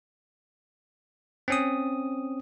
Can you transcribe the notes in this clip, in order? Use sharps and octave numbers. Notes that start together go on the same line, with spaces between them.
C4 C#4 D#6